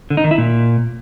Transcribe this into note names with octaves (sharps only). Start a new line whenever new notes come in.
D3
D#4
D#3
E4
A#2